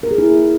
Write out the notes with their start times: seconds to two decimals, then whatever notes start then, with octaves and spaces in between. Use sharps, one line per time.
0.03 A#4
0.11 G#4
0.18 E4